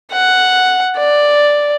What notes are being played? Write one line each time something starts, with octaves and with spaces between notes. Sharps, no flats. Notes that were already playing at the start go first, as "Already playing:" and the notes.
F#5
D5